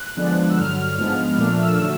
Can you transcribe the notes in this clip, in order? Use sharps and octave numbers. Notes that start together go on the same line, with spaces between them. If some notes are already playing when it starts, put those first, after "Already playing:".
Already playing: F#6
D3 F3 G#3 B3 D4
E6
G2 D3 F#3 F6
G#2 F3 G#3 B3 D4
A#2 F3 A3 D4 F6
E6
D3 F#3 A3